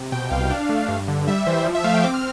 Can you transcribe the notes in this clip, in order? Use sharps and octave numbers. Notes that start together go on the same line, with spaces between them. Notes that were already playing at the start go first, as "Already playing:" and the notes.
Already playing: C3
B2 G5
C2 F5
D4
A3
G2
D3
G3 E5
E3 C5
F3
E5
A3 F5
G5
C4 D6
F6